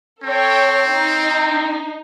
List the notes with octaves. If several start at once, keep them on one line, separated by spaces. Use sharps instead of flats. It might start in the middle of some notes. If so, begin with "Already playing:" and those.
C4 A4 C#5 G5
D#4